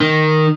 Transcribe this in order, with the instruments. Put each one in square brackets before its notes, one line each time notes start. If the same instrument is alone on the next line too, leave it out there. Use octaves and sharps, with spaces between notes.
[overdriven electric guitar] D#3